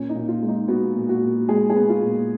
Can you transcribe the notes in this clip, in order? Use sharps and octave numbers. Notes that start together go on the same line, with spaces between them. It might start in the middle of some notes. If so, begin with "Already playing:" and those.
Already playing: A#2 C#4
D#4
A#2
F4
G#3
D#4
B3 F#4
A#2
F#4
A#2
G#3 G#4
G#4
B3
F4
A#2